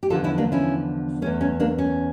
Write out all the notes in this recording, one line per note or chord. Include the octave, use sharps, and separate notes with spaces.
G4
E2 D3 F3 F4 A4
C#4 E4
A#3 D4
C#4 E4
E2 E3 A3 C#4
C#4
A#3 D4
C#4